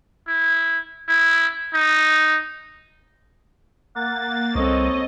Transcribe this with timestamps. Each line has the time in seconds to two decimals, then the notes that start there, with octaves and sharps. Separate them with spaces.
0.28 E4
1.09 E4
1.73 D#4
3.95 A#3 F#5 A6
4.55 C2 C4 A4 C#5 D#5